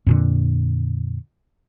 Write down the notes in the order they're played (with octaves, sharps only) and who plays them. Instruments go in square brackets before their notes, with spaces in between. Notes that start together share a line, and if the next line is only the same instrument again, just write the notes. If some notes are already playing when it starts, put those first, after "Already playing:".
[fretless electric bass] F2 A#2 D3